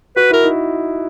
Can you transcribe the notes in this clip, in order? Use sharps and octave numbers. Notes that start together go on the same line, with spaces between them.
F#4 B4
E4 A#4
D#4